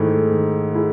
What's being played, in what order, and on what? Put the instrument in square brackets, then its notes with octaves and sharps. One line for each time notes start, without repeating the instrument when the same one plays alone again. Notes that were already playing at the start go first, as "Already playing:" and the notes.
Already playing: [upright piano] G#2 [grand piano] D#3 A3 E4 G#4
[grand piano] D#3
A3 E4 G#4